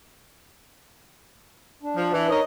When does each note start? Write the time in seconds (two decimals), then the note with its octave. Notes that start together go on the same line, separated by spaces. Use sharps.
1.83 D4
1.97 F3
2.13 E3
2.30 D#4 A#4 C#5 D#5